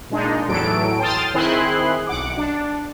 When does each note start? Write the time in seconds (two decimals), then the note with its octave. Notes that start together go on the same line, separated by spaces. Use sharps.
0.10 A#2 G#3 D4 D#4
0.48 E2 A2 E3 F#3 A4 D7
1.00 G5 A5 C6 D#6 F6 A6
1.34 D#3 C4 E4 G#4 C6 F#6
2.07 B1 F#5 D6
2.37 D4